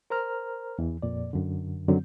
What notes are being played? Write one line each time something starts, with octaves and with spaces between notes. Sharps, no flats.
A#4 C5 A#5 F6
E2 E3
F2 A#2 D5
F#2 D3
F#2 D3 D#3 F#3 C4